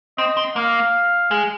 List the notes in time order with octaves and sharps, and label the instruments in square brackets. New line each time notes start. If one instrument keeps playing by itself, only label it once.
[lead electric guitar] C4 [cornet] D#5
[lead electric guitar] C4
[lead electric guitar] A#3 [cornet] F5
[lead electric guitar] G#3